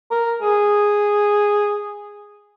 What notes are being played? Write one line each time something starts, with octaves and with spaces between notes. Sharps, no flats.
A#4
G#4